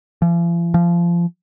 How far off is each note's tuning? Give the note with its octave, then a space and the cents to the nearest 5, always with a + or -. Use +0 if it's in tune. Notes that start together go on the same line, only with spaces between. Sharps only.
F3 -45
F3 -25